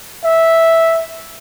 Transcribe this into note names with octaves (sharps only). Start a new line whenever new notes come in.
E5